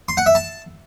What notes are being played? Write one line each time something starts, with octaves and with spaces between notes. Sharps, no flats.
C6
F#5
E5
A5